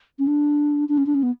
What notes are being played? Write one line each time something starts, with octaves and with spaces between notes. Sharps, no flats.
C#4
D4
D4
C#4
D4
C#4
B3